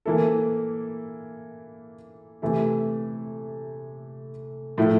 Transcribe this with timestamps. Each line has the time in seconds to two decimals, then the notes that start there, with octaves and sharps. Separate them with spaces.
0.06 E3 A#3 E4 A4
2.42 C3 E3 A3 E4
4.78 A2 F3 A3 E4